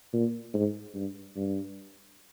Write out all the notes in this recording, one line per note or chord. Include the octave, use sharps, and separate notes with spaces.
A#2
G#2
G2
G2